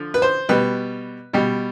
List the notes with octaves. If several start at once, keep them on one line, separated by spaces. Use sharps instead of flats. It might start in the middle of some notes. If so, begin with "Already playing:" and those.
Already playing: D3 F3
B4
C5
B2 G3 B4
B2 G3